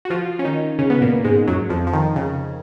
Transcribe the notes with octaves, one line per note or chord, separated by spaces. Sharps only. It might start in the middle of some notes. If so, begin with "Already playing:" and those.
F#4
F3 F4
C#4
D#3 D#4
C#3 C#4
B3
A#2 A#3
G#2 G#3
F#2 F#3
F2 F3
F3
D#3
C#3